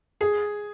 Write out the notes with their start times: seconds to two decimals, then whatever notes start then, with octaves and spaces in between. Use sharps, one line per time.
0.21 G#4